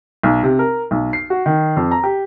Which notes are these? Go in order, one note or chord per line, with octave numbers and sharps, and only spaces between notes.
B1
C3
A#4
B1
C7
F#4
D#3
F2
A#5
G4